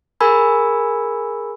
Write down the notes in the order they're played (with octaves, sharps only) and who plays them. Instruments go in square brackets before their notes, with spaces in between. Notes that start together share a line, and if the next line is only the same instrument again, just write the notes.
[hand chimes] G#4 A#4 G#5 B5 E6 G#6